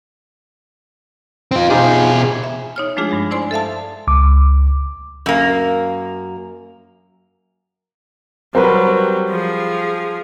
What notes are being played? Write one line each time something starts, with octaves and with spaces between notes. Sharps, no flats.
C4 F4
B2 D#4 F4 G4 G#4
E5
D#4 C#5 F6
F3 G#3 A3 D4 F4 G#4
G2 F3 G#3
D#4 E4 C5 D5 G#5 C6
A4 E5 F5 A5
C#2 D6
F#2 A#3
F#3 G3 C4 A#4 B4
F3 G#4